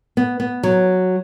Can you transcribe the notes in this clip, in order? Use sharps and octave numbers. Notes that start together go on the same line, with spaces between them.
B3
B3
F#3